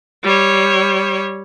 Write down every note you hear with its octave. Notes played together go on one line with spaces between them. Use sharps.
G3 C#5